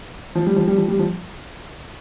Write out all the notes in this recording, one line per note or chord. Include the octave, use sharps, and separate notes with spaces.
F3
G3
F3
G3
F3
G3
F3